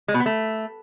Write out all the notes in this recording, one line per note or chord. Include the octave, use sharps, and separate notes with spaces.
G#3
B2
B3
A3